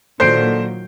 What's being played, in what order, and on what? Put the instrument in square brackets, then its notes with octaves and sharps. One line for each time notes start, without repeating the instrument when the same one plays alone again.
[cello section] A#2 D#3 F#3 [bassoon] D3 [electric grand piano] C5 [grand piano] G6 C7 D7